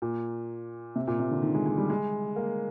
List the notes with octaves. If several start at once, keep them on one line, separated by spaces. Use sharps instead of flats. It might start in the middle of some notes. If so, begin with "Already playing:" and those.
A#2
C3
A#2
C3
D3
D#3
G#3
G#3
G3
G#3
A#3